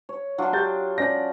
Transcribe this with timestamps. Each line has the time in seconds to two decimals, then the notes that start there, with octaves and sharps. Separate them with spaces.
0.09 C#5
0.38 F#3 D4 F4
0.53 G4 G6 A6
0.98 C#4 D5 A#6